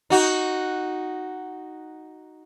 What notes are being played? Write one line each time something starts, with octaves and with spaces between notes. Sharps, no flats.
D#4 F#4